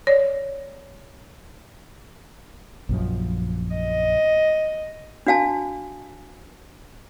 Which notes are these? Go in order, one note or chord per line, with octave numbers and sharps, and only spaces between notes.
C#5 D5
A#1 F#2 F3
D#5
D4 F#4 F5 G#5 A5